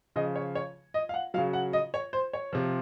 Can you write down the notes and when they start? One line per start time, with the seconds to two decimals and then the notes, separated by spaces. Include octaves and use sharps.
0.16 C#3 F3 D#5
0.36 C#5
0.55 C#5
0.94 D#5
1.09 F5
1.14 F#5
1.34 F#3 F5
1.38 C#3
1.53 F#5
1.73 D#5
1.94 C#5
2.13 C5
2.33 C#5
2.53 C3 F3